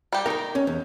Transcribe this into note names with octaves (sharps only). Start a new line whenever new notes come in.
G3 G4
D#3 D#4 A#4 A#5
C#4
E2